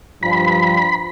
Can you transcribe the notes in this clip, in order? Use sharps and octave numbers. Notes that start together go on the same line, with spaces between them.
G2 F3 B5